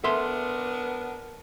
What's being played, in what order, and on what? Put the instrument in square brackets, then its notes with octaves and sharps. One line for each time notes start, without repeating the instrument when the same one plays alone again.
[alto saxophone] B3 [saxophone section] D4 A#4 [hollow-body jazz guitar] A4 E5 C6